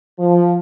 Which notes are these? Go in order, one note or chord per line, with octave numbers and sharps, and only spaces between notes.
F3